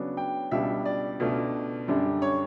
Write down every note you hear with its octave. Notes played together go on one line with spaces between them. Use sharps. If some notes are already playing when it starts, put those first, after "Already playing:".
Already playing: C#3 F#3 B3 D4
G5
C#2 B2 G3 D4 E5
D5
C#2 B2 A3 D4
F#2 D3 G3 D4
C#5